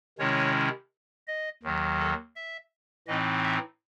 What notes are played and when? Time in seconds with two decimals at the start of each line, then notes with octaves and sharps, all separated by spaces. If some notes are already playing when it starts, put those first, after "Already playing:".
0.19 C3 D#3 G#3 C#4 E4 C#5
1.27 D#5
1.63 D#2 D#3 F#3
1.99 A4
2.36 E5
3.07 A2 E3 C4 D#4 D#5
3.44 E5